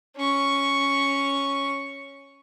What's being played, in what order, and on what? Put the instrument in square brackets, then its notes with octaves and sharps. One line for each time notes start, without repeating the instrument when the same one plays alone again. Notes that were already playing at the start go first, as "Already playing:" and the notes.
[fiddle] C#4 C#6